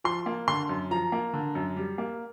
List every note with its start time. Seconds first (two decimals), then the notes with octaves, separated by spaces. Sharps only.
0.04 F3 C6
0.26 A#3
0.48 D3 C6
0.69 F#2
0.91 F3 A#5
1.12 A#3
1.34 D3
1.55 F#2
1.77 G3
1.98 A#3